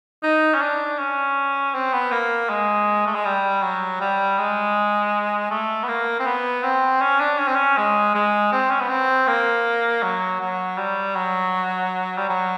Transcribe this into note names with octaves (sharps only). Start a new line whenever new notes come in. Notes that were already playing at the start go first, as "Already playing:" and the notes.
D#4
C#4
D4
C#4
C4
B3
A#3
G#3
A3
G#3
G3
F#3
G3
G#3
A3
B3
A#3
C4
B3
C4
C#4
D4
C#4
C4
C#4
G#3
G#3
C4
C#4
B3
C4
A#3
F#3
F#3
G3
F#3
G3
F#3